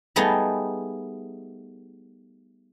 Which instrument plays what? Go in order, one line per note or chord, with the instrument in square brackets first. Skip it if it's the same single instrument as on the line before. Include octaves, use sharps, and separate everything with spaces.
[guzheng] G3 A3 B3 D#4 G#4